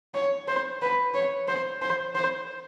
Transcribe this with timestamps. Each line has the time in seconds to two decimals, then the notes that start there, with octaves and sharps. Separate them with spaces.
0.14 C#5
0.48 C5
0.82 B4
1.14 C#5
1.48 C5
1.82 C5
2.15 C5